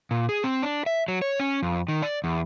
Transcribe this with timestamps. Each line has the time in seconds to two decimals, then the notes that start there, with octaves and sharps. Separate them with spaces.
0.11 A#2
0.29 G#4
0.44 C4
0.62 D4
0.86 E5
1.08 F#3
1.22 C#5
1.40 C#4
1.62 F2
1.88 D#3
2.02 D5
2.24 E2